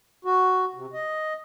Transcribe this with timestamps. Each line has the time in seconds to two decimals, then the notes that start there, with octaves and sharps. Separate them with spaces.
0.25 F#4
0.74 C3
0.93 D#5